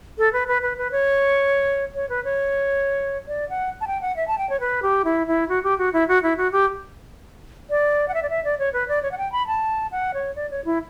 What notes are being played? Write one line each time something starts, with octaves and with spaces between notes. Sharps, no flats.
A4
B4
B4
B4
B4
C#5
C#5
B4
C#5
D5
F#5
A5
G5
F#5
E5
A5
G5
C#5
B4
G4
E4
E4
F#4
G4
F#4
E4
F#4
E4
F#4
G4
D5
F#5
E5
D5
E5
D5
C#5
B4
D5
C#5
F#5
G5
B5
A5
F#5
C#5
D5
C#5
E4